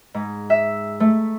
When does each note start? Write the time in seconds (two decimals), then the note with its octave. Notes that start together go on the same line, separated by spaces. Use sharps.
0.14 G#2
0.50 E5
1.00 A3